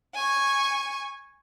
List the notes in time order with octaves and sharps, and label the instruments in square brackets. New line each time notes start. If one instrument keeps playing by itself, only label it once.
[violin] G#5 C#6